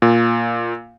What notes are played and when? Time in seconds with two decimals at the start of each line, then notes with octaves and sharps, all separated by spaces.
0.02 A#2